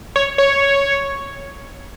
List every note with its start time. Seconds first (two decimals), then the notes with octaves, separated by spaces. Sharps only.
0.16 C#5
0.38 C#5